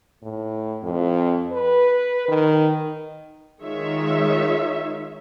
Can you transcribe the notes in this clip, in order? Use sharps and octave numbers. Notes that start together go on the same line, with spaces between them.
A2
F2
B4
D#3
D#3 G#3 D#4 F4 C#5 E5